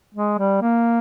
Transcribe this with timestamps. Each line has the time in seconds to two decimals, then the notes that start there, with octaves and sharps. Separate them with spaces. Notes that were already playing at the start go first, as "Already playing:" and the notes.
0.14 G#3
0.38 G3
0.61 A#3